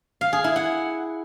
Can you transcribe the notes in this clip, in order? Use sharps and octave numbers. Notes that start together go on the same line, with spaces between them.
F5
G#4
E4
F#5